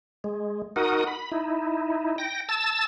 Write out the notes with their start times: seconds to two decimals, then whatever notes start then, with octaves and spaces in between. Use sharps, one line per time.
0.24 G#3
0.76 D#4 F#4 A#4 F#5 D#6
1.07 B5
1.32 D#4 E4
2.18 G5 A#6
2.49 A5 E6 A6